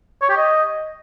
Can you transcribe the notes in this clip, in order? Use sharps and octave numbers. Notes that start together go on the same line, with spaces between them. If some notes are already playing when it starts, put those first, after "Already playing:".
C#5
G4
D#5